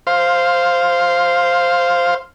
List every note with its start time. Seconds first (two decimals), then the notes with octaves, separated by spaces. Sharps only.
0.07 C5 F5